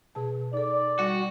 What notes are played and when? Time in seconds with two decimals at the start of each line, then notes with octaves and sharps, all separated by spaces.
0.15 B2 G#4 A5
0.53 D#4 A4 D5
0.99 G3 F#4